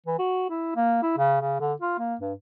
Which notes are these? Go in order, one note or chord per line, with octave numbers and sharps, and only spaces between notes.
E3
F#4
E4
A#3
E4
C#3
C#3
D3
F4
A#3
G2